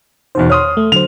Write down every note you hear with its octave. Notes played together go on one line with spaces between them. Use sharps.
E2 B2 D#3 C5
C#5 C6 D#6 F6
A3
D3 F#3 C5 F7